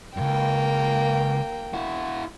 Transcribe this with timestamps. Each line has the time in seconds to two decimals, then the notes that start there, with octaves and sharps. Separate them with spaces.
0.17 C#2 F#2 A#3 G5
1.73 E4 F#4